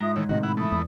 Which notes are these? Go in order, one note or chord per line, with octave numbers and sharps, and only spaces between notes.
G#2 F4 E5 A#5 D#6
A2 D#3 E3 C#5
A2 C3 D#3 F#4 D#5
E4 F#5 B5
E3 A3 E5 B5 D#6
E2